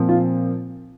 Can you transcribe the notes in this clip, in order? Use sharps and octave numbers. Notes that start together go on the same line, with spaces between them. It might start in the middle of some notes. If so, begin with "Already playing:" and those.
Already playing: A#2 F3 C4
F4